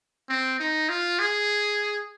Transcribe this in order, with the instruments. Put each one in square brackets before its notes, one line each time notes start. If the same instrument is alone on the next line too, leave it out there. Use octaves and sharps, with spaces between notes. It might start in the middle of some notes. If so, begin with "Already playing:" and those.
[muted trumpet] C4
D#4
F4
G#4